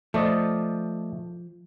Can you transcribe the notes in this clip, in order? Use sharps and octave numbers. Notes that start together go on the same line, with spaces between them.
F3 A3 D5 D#5